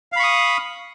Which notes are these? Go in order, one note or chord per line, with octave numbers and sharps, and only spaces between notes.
F5 B5 C#6 D#6